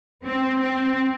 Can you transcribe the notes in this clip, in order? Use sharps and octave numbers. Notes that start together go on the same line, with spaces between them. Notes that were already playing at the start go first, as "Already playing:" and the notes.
C4
C4